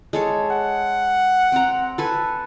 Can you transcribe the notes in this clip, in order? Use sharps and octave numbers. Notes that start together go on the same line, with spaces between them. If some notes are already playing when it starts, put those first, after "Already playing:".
G#3 A4 C#5
F#5
C4 A#5
A4 B4 G#5